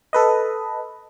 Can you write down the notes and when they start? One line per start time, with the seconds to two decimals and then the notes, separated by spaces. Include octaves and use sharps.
0.13 A4 B4 D#5